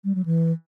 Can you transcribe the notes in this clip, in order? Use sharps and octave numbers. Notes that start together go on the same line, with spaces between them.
G3
F#3
E3